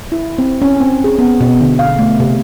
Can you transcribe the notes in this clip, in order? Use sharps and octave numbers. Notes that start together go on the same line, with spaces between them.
E4
C4
C#4
C4
G#4
B3
B2
D3
F5
A3
C3